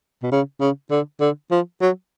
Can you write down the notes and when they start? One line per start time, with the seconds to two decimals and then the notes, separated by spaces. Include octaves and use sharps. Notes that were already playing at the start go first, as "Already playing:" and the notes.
0.23 B2
0.32 C#3
0.61 C#3
0.91 D3
1.20 D3
1.51 F3
1.81 F#3